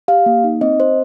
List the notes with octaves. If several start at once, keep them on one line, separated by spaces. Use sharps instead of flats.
G4 F5
A#3
D#4
C4 D#5
C4 C5